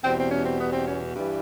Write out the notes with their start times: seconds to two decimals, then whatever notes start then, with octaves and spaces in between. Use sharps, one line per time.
0.04 E2 B2 G3 C4
0.18 C4
0.31 C#4
0.45 C4
0.59 B3
0.73 C4
0.86 C#4
1.14 G2 E3 G3